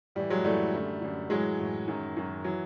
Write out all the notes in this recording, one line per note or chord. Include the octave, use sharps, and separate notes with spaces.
A2 E3 G3
F#3 G#3
A2 E3 G3 A3
F#2 D3
F#2 D3
A2 E3 F#3 G#3
A2 E3
F#2 D#3
F#2 D#3
E3 F#3